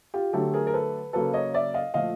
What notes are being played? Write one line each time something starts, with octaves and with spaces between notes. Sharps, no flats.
F4 G4
D3 F#3 A3 G4 A4
G#4 A#4
A#4
A4 B4
C#3 F#3 A#3 A4 B4
C#5 D#5
D5 E5
D#5 F5
A#2 F3 A3 D#5 F5